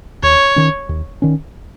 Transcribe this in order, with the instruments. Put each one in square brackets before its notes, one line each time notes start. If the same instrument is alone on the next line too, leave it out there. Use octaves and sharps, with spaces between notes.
[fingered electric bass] D#2 [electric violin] C#5
[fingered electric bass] D#3 C#4
D#2
D#3 C#4